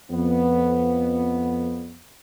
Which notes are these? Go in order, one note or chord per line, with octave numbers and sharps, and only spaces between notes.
F2 B3